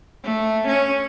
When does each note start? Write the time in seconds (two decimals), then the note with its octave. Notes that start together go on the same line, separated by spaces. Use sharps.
0.24 A3
0.67 C#4